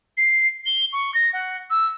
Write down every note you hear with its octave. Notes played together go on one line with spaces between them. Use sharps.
C7
G7
C#6
A#6
F#5
E6